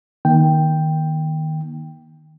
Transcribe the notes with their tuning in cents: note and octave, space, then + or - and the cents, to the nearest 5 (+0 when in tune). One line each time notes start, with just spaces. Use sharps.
D#3 +0 A#3 +30 G5 +0